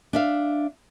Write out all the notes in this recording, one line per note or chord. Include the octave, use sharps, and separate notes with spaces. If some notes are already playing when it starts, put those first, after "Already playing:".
D4 E5 F5